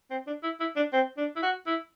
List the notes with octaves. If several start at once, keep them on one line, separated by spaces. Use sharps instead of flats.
C4
D4
E4
E4
D4
C4
D4
E4
F#4
E4